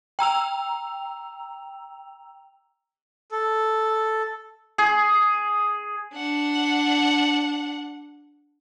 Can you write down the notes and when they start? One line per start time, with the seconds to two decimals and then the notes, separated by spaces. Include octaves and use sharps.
0.19 G5 A#5 E6 F7
3.32 A4
4.78 G#4
6.14 D4 F#5